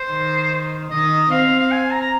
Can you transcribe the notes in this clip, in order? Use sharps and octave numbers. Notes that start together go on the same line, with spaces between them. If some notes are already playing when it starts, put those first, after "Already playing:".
Already playing: C5
D#3
D#3 D#5
C4 F5
F5
G#5
A#5
A#5